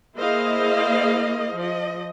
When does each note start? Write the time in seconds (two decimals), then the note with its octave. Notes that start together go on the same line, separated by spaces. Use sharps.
0.17 A#3 E4 G#4 C5 D#5 F5
1.55 F3 D#5